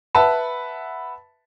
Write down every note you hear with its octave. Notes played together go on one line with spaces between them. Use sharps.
B4 E5 F#5 A5 B5